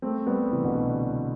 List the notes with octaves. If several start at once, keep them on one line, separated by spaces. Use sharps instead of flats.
A3 C4
G3 B3
C3 E3
B2 D3